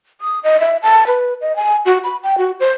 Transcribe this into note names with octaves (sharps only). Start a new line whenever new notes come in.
D#6
D#5
E5
A5
B4
D#5
G#5
F#4
B5
G5
F#4
C5